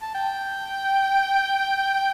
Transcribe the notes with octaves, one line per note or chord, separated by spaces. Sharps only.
A5
G5